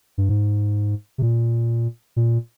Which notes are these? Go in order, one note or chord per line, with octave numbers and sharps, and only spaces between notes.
G2
G#2
C3
A#2
A#2